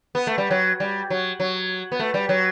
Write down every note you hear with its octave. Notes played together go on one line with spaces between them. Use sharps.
B3
A3
G3
F#3
G3
F#3
F#3
B3
A3
G3
F#3